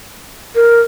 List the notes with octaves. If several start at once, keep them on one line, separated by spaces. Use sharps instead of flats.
A#4